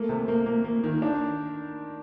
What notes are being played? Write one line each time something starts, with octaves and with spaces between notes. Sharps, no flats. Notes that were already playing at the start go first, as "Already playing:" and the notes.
Already playing: A3 A#3
C3
A#3
A#3
A#3
D#3
D4